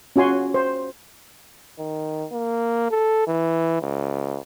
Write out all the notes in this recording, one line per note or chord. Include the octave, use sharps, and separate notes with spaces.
C#4 F4 F#4 G#5 C6
C5
D#3
A#3
A4
E3
C#2